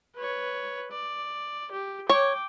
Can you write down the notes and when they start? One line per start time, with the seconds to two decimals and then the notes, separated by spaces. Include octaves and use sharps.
0.16 B4 C#5
0.92 D5
1.72 G4
2.09 C#5 G5 D6